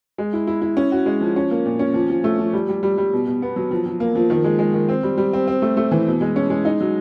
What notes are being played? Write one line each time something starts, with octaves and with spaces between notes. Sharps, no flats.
G#3
E4
E4
E4
C#4
F#4
G#3
F3
C#4
A#3
A#2
C#4
F3
F3
A3
F3
G3
G3
G3
G3
B2
B2
B3
F#3
F3
F3
A#3
F3
D#3
G#3
G#3
D#3
C4
G3
G3
C4
C4
A3
A3
E3
B2
G#3
C#4
G#3
D#4
F#3